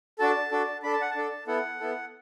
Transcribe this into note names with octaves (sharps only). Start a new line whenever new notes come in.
D4 F#4 A4 A5
D4 F#4 A4
D4 A4 B5
A5
F#5
A5
D4 A4
B3 E4 A4 F#5
B3 E4 A4